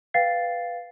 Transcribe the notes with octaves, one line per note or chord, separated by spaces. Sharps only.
B4 F5 G5 A6 C7